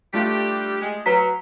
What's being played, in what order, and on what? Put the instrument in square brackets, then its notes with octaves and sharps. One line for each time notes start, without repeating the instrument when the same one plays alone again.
[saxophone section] G3 D4 G4 [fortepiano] A3 F4
[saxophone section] G#3
[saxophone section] F#3 [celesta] B4 A#5 B6